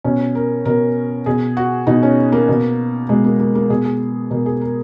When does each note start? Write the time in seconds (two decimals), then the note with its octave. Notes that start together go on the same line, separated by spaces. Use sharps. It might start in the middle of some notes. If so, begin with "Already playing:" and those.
0.04 B2 C#4
0.35 A#4
0.65 B2 A#4
1.26 B2 G#4
1.57 F#4
1.87 B2 D#4
2.03 C#4
2.32 A#3
2.49 B2
3.09 B2 G#3
3.24 A#3
3.40 A#3
3.55 A#3
3.70 B2 G#4
3.85 G#4
4.31 B2 A#4
4.46 G#4
4.61 A#4